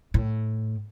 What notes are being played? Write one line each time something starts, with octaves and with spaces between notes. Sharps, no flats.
A2